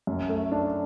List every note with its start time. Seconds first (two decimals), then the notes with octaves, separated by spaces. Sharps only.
0.07 F#2
0.29 A3
0.52 D4